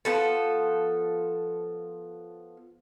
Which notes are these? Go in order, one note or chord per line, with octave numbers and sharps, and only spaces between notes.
F3 B3 A4